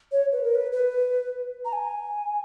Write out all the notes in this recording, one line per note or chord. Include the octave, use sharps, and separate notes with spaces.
C#5
B4
A#4
B4
B4
A#5
G#5